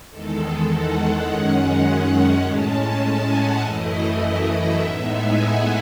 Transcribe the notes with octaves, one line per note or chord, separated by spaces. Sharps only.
E2 D#3 G#3 A4
F#5
F#2 D#3 G#3 C#4 F#5
A2 G#3 C#4 A5
G#5
F#5
F#2 E3 A3 E4 D#5
E5
A2 G#3 B3 D#4 E5
G#5
F#5